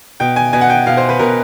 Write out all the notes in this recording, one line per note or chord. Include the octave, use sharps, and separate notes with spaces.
B2 G5
G#5
B2 G#5
F#5
G5
B2 F5
C5
B4
B2 A#4